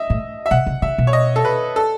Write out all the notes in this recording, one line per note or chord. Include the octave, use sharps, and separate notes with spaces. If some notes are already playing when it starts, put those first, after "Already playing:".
Already playing: D#5 E5
A2
E5
B2 F#5
C#3
C#3 E5
B2
C#5
D#5
A4
B4
A4